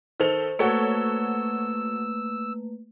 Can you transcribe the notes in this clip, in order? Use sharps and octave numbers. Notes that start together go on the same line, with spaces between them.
D#3 A4 C5 F7
A3 A#3 F#4 A4 B4 C#5 E6